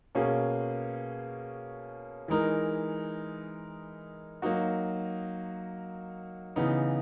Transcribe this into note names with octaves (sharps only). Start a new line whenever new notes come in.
B2 A#3 C#4 G#4
E3 G#3 D#4 A#4
F#3 A#3 D#4 F#4
C#3 E3 B3 D#4